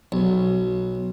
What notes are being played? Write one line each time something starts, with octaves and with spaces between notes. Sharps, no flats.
B1